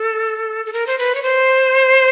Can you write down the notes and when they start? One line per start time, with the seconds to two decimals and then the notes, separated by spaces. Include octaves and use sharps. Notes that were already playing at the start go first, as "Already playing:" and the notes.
Already playing: A4
0.66 A4
0.73 A#4
0.87 C5
0.98 B4
1.15 C#5
1.23 C5